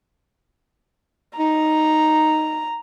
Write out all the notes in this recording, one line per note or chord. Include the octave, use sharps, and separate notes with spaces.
D#4 A#5